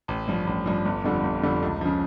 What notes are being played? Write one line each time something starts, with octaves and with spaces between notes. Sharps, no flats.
A1
G2 F3
A1
G2 F3
G1
F2 D3 G3
G1
F2 D3 G3
C#2
C#3 F3